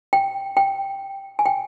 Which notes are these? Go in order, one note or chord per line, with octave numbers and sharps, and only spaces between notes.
G5
G5
G#5
G5